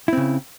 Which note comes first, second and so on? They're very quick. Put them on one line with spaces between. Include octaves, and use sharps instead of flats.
E4 C4 C#3